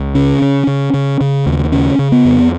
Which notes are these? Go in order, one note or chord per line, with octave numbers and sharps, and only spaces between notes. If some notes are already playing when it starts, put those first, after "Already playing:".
Already playing: C#2
C#3 C#4
C#3
C#3
C#3
C#3
D#2
C#3 C#4
C#3
B3
F2